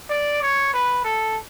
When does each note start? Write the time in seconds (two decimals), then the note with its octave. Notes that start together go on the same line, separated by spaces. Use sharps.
0.10 D5
0.42 C#5
0.73 B4
1.04 A4